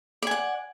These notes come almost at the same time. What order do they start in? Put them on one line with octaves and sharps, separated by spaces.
D5 G#5 F#5